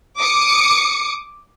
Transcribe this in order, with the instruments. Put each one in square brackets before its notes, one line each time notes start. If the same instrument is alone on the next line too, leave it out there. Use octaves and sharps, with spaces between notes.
[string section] D6 D#6 C#7